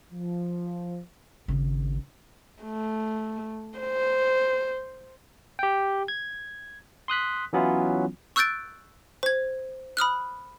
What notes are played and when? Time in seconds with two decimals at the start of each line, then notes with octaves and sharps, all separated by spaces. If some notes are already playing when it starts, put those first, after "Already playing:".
0.12 F3
1.48 G#1 C#3
2.63 A3
3.79 C5
5.59 G4 G5
6.08 G#6
7.08 C6 D#6 F#6 B6
7.53 E3 F#3 B3 C#4 E4 F4
8.36 C#6 E6 F#6 G6 A6 D7
9.23 C5 G#6
9.97 B5 D#6 F6 F#6